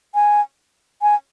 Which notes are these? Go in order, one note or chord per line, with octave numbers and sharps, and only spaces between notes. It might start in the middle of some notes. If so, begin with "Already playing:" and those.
G#5
G#5